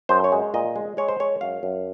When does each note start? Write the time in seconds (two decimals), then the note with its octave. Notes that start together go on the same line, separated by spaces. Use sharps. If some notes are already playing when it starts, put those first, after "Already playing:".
0.09 F#2 C5
0.24 C#5
0.32 G#3
0.54 A#2 D#5
0.76 G#3
0.97 G#3 C#5
1.08 C5
1.20 G#3 C#5
1.41 F#2 F5
1.63 F#2